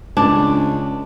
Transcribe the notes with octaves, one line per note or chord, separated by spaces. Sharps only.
C#2 D4